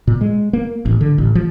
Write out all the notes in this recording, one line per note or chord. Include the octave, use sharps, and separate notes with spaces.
A#2
G#3
A#3
A1
D3
A1
F3